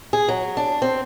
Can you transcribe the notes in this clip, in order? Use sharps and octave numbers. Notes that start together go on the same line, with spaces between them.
G#4
F#3
D4
C4